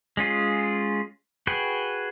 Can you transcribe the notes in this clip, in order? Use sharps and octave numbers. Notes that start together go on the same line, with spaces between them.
G#3 C#4 F4 G#4
F#4 G#4 B4 G5